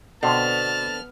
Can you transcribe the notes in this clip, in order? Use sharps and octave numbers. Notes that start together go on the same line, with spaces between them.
B2 D3 B3 C4 A5 F6